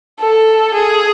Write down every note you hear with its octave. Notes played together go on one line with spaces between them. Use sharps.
A4
G#4